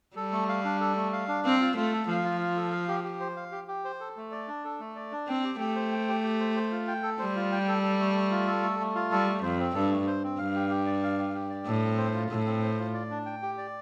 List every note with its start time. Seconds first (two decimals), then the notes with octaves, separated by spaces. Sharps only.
0.16 G3 A4
0.32 A3
0.49 F5
0.65 D4
0.80 A4
0.97 A3
1.13 F5
1.28 D4
1.45 C4 F5
1.61 F4
1.77 A3 F4
1.93 A4
2.08 F3 F5
2.24 F4
2.41 F4
2.57 A4
2.72 F5
2.88 G4
3.04 G4
3.20 C5
3.37 F5
3.52 G4
3.68 G4
3.85 C5
4.00 A4
4.17 A3
4.32 D5
4.48 D4
4.65 A4
4.80 A3
4.96 D5
5.12 D4
5.28 C4 G5
5.44 G4
5.60 A3 G4
5.76 C5
5.92 G5
6.08 G4
6.24 G4
6.40 C5
6.56 C5
6.71 F4
6.88 G5
7.03 A4
7.19 G3 C5
7.36 F4
7.52 G5
7.68 A4
7.83 A4
8.00 A3
8.15 A3
8.31 F4
8.47 A4
8.63 A3
8.79 A3
8.95 F4
9.11 G3 A4
9.27 A3
9.42 F2 C5
9.59 C4
9.75 G2 A4
9.91 A3
10.07 C5
10.23 C4
10.38 G2 F5
10.55 G4
10.70 G4
10.87 D5
11.03 F5
11.19 G4
11.34 G4
11.50 D5
11.66 A2 A4
11.83 C4
11.98 C5
12.14 F4
12.30 A2 A4
12.46 C4
12.62 C5
12.79 F4
12.94 D5
13.11 D4
13.26 G5
13.42 G4
13.58 D5